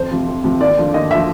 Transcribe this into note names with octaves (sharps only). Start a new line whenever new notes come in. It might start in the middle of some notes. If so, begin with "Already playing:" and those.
Already playing: F2 C5
C3 F3
F2
C3 F3
D#2 D5
D3 F3
D#2 D#5
D3 F3 E5